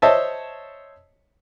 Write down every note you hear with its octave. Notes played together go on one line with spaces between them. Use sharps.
C5 C#5 D#5 E5 A5